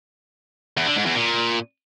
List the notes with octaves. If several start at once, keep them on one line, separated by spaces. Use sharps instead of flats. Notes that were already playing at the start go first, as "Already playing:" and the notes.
E2
D3
G#2
E2
A#2